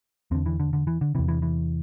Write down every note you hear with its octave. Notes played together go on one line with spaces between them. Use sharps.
E2 D3 C4
E3
D3
D3
E3
D3
E2 C3 E3
E3
E3